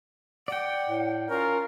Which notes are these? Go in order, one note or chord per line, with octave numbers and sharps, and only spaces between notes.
D5 F#5 G5
A2
C#4 F4 A#4